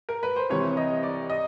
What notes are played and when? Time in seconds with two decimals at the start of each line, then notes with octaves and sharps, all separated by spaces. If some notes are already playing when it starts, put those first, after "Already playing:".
0.09 A#4
0.23 B4
0.36 C5
0.50 C2 C3 E3 C#5
0.77 D#5
1.03 D5
1.30 D#5